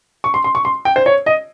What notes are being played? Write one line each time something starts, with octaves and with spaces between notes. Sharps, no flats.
C#6
C6
C6
C#6
C6
G5
C5
C#5
D#5